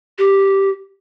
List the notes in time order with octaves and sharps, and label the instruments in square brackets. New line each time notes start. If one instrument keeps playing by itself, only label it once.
[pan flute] G4